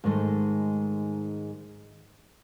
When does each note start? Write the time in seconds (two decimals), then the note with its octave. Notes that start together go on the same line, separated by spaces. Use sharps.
0.04 G#2 D#3 G#3 A3